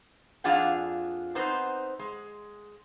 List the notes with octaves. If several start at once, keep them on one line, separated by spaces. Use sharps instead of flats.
F2 F3 D4 F4 G#4 F#5
B3 C4 D#4 C5
G#3